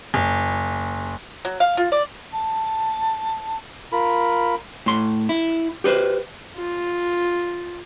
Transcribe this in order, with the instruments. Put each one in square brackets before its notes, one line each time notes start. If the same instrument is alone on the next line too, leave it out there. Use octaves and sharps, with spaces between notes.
[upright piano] F#1
[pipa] F#3
F5
F4
D5
[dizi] A5
[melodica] F4 A#4 B5
[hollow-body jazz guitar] A2 C6
E4
G4 A4 B4 C5
[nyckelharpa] F4